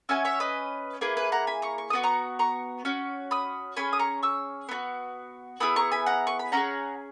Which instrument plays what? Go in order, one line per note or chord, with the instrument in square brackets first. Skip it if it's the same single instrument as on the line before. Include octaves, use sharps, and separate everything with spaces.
[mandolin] C#4 F#4 E5 G#5
C#5 E5
B4 D#5
A#3 E4 G#4 B4
B4
F#5 A#5
G#5 B5
A#5 C#6
C#6
B3 F#4 D#6
A#5 C#6
A#5 C#6
C#4 F#4
B5 D#6
C#4 G#4 G#5 B5
D#6
A#5 C#6
C#6 E6
B3 D#4 F#4
B3 E4 G#4 B5 D#6
A#5 C#6
G#5 B5
F#5 A#5
C#6
B5
C#4 E4 G#4 F#5 A#5